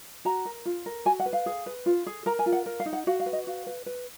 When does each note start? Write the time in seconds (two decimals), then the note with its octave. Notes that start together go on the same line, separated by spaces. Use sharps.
0.25 F#4 A#5
0.45 A#4
0.65 F4
0.86 A#4
1.05 F#4 G#5
1.20 F#5
1.26 B4
1.33 F5
1.46 G#4
1.66 B4
1.86 F4
2.06 G#4
2.26 A#4 A#5
2.39 G#5
2.46 F4
2.52 F#5
2.66 A#4
2.80 F5
2.86 D#4
2.93 F#5
3.07 F#4 F5
3.20 F5
3.26 B4
3.33 D#5
3.47 F#4 F5
3.66 B4
3.86 B4